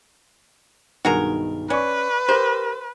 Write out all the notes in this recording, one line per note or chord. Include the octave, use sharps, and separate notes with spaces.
B1 G2 D#3 F#4 G#4 A#4
C#4 B4 D5 C#6
G4 A#4 C5